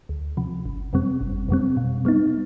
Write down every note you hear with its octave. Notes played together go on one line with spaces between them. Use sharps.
D2
C3 F3
G1
F2 C3 G3 C4
G1
F2 C3 G3 C4
B2
G3 B3 D#4